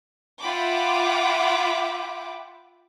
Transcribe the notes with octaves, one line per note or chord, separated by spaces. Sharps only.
F4 E5 F#5 G5 B5 D6